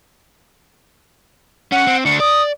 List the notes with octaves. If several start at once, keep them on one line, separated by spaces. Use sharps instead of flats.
C#4 F#5
C4
D2 D4 C#7
D5 D#6